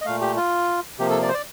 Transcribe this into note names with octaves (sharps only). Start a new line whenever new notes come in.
D#5
A#2 A3 F5
G4
F4
C3 F3 A#3 G4
A4
D5
C5
D5